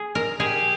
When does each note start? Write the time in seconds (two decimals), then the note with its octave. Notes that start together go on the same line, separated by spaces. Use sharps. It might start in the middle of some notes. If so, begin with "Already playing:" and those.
Already playing: G#4
0.15 A#4
0.40 G4 G#4